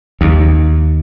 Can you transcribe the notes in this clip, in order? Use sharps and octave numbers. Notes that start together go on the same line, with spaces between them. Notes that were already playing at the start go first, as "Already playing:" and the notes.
D#2